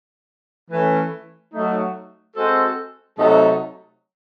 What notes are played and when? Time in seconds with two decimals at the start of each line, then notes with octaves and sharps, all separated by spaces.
0.69 E3 A3 C#4
1.53 F#3 A3 D#4
2.36 G#3 C4 F#4 A4 C5
3.18 C3 F#3 A3 D#4 A4